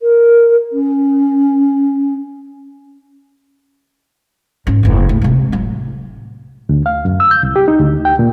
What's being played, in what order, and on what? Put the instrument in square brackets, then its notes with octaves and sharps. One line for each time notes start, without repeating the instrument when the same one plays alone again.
[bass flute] A#4
C#4
[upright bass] G#2 C#4
F#1 D2
A2
C3 G#3
A2 F#3
[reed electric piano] D2
F5
F#2
E6
G6
C2
G4
D#4
D2
G5
A#2